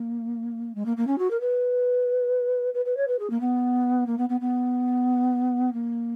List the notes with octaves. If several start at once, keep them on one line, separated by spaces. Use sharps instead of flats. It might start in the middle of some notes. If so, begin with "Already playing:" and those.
Already playing: A#3
G#3
A#3
A#3
C#4
F#4
A#4
B4
B4
B4
C#5
B4
G#4
A#3
B3
A#3
B3
B3
B3
A#3